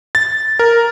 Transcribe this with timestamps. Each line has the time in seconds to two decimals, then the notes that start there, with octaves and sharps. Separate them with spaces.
0.15 A6
0.59 A#4